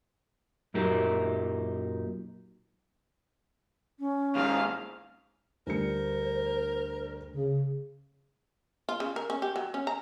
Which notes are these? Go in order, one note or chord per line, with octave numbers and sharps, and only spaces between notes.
F#2 A#2 F#3 D#4 G4 A#4
C#4
D#2 G#2 F5
D2 G3 A#4 C5 C#7
C#3
F4
C#3
A#4
C#4
G4
F#3
C#4
A#5